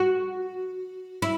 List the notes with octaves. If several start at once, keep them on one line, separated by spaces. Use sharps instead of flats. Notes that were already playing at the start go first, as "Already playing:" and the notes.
Already playing: F#4
E4